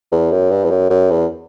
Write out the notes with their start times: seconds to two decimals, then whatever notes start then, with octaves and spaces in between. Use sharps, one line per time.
0.12 E2
0.31 F#2
0.51 G2
0.64 E2
0.70 F#2
0.90 F#2
1.10 E2